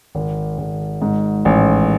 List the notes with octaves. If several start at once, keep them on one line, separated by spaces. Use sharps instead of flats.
G#1
G#1
G#2
A1